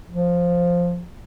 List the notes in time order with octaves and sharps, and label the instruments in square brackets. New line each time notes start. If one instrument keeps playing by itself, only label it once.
[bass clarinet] F3